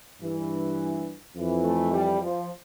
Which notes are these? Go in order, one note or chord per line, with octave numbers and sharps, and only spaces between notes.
G2 E3
F2 E3
A3
G3
F3